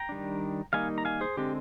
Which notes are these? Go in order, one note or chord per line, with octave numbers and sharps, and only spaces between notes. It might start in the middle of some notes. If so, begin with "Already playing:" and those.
Already playing: G5 A#5
D#3 G3 D4
D#3 G3 A#3 D#4 F5 G#5
A#5
F5 G#5
G#4 C5
D3 G#3 C4 G4